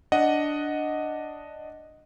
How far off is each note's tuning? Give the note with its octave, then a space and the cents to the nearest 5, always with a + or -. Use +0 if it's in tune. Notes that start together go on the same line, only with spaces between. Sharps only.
D4 +0 D#5 +0 F#5 +0